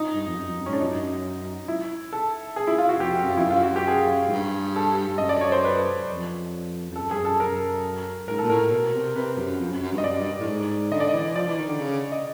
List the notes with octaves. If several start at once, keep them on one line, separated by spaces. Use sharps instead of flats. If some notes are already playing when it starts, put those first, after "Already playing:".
Already playing: D#4
G2
F2
F#2
F2
F#2
C#4
G#2 D4
F#2 D#4
E4
A4
G#4
E4
F4
F#4
F2 G4
F#2
F2 E4
F#2
F4
F#4
G4
G#4
G#2
G2
A4
G2
F#2 D#5
D5
C#5
C5
B4
F2
F2
F#2 A4
G2 G#4
F#2
A4
F#2 A#4
G#2 A#4
A#2 A4
A2 A#4
B2
C3
C3 B4
F#2
F2
F#2
F#2
G2
D#5
F#2 D5
G2
A2
G#2
D3 D#5
D5
D#5
E3
F3 D5
E3
D#3
D3
C#3
D#5